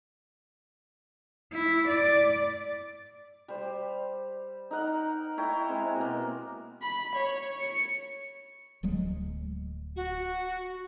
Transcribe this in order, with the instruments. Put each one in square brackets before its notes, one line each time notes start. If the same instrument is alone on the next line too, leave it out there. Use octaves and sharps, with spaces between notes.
[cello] E4
D5
[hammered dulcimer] G3 C5
D#4 A#4 F#5
E4 C#5 G5 A#5
G#3 C4
B2 A#3
[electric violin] B5
C#5
C#7
[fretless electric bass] D1 F#3 G#3
[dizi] F#4